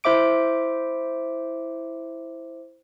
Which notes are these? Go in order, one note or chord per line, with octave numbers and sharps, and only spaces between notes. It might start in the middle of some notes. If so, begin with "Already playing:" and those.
E4 C5 E5 D6 D7